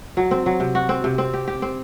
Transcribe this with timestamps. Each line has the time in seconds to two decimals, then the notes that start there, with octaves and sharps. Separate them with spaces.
0.17 F#3
0.31 C4
0.46 F#3
0.60 C3
0.75 F#4
0.89 C4
1.04 C3
1.18 C4
1.34 G4
1.48 G4
1.62 C4